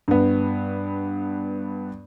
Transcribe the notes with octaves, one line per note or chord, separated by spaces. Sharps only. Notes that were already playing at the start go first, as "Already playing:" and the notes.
G2 B3